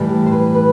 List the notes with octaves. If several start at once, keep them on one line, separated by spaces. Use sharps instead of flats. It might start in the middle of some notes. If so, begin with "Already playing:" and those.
Already playing: A2 E3 G3
G4
C5
B4
B4